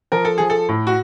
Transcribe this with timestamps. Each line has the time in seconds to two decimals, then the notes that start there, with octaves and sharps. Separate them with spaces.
0.12 F3 A#4
0.25 A4
0.38 F3 G#4
0.50 A4
0.69 A2
0.87 F#4